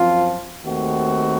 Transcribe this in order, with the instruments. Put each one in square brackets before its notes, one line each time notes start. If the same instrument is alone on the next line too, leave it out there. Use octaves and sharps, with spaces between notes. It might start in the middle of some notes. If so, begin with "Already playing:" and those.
Already playing: [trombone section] F#2 F3 C4 F4
D#2 D#3 A3 C4 F#4